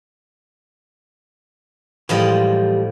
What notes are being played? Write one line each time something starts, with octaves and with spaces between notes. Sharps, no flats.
A2 E3 F3 G3 G#3 D#5